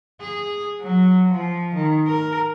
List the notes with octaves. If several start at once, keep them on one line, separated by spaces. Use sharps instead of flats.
G#4
F#3
F3
D#3
A#4